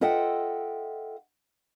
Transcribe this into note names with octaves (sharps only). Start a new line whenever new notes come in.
F4 A4 D#5 E5 F#5 G5